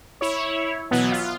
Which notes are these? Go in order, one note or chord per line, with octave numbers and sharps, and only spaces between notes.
E4 C#5
B2 E3 F#3 B3
F4